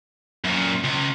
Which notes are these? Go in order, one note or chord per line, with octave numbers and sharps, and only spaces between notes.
F#2 A#2
C#2